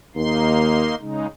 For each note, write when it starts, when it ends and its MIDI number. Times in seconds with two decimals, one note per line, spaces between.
0.15 0.89 39
0.15 0.95 58
0.15 0.95 63
0.15 0.95 84
1.00 1.27 49
1.00 1.27 56
1.00 1.27 63